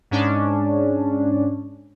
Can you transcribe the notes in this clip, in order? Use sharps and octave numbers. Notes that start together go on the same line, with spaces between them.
G#2 C#4 D4